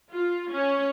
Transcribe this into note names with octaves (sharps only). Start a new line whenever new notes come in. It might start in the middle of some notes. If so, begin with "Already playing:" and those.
F4
C#4